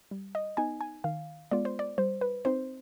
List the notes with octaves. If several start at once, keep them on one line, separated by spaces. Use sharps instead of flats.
G3
D#5
B3 D#4 G#5
G#5
D#3 F5
G#3 B3 F4 D5
C5
D5
G3 C5
B4
C4 D#4 C5